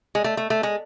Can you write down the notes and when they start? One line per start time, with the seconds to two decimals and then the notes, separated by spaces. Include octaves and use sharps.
0.15 G#3
0.24 A3
0.37 A3
0.50 A3
0.63 G#3